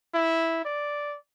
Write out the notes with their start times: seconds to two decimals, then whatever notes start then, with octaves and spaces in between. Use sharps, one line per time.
0.15 E4
0.65 D5